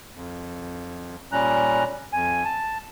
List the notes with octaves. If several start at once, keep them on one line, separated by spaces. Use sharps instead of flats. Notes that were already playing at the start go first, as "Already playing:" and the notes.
F2
A#2 G3 C#4 A#5 F#6
F2 G#5
A5